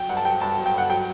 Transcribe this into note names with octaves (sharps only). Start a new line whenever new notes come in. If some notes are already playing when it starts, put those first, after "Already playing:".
Already playing: F#3 G5
G2 F#5
A5
F#3 G5
G2 A5
F#3
G5
G2 F#5
F#3 G5